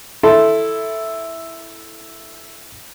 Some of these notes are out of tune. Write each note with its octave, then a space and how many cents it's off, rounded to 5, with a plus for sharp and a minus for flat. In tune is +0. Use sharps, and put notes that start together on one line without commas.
E4 +0 A4 +0 C6 +0